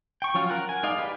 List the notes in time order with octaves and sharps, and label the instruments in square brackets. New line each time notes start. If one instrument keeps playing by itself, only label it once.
[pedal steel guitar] G5 C#6
F3 F#3 C#4 F4
A#4 F#5
G#5
G#3 D#4 D5 D#5 F5
G4 B4 D5